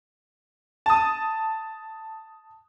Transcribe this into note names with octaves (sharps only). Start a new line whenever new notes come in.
A5 D#6